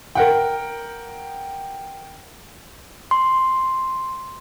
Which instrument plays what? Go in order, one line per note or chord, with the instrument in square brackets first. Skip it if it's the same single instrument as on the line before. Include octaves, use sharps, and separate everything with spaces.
[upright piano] A#4 F#5 G5
[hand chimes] C6